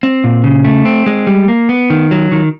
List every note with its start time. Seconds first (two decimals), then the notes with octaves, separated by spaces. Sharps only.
0.03 C4
0.24 A#2
0.44 C#3
0.65 A3
0.85 C4
1.06 G#3
1.27 G3
1.48 A#3
1.69 B3
1.90 D#3
2.11 F#3
2.32 D#3